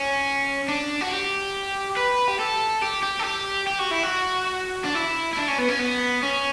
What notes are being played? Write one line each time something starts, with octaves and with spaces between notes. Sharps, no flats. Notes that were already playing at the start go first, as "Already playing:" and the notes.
Already playing: C#4
D4
F#4
G4
B4
G4
A4
G4
G4
A4
G4
G4
F#4
E4
F#4
D4
E4
E4
D4
C#4
B3
C#4
B3
C#4